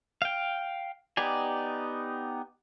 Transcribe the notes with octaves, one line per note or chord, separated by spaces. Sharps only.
F5 G5
B3 D#4 G4 D5 G#5